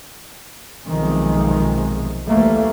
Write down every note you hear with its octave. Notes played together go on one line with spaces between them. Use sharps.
B1 C3 D#3 F3 G#3
D2 E3 G3 A3 A#3